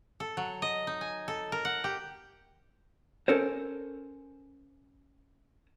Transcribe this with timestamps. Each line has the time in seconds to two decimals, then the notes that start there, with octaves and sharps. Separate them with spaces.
0.20 A4
0.37 F#3
0.62 D#5
0.87 D#4
1.01 G#5
1.28 A4
1.52 A#4
1.65 F#5
1.84 G4
3.28 C#4 A4 A#4 C5